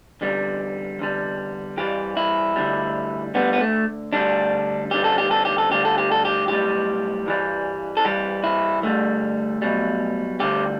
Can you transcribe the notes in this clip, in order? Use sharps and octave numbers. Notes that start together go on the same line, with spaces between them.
E2 D3 G3
E2 D3 G3
G2 E3 G3 G4
E4
D2 D3 G3
D2 D3 G3 B3
B3
A3
D2 D3 G3 D4
E2 D3 G3 G4
A4
G4
A4
G4
A4
D2 D3 G3 G4
A4
G4
A4
G4
B1 A2 G3 G4
G2 E3 G3
A4
G2 E3 G3 G4
E4
D2 D3 G3 A3
B1 B2 G3
D2 D3 G3 G4